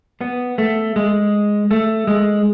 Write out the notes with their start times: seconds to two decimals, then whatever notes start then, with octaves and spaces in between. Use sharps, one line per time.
0.21 B3
0.58 A3
0.96 G#3
1.71 A3
2.07 G#3